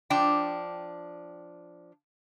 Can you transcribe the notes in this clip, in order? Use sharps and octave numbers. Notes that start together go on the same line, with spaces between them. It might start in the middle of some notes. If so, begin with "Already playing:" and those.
F3 D4 G5